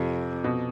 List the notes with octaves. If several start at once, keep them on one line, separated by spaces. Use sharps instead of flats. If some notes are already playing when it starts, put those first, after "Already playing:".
Already playing: F2 C3
B2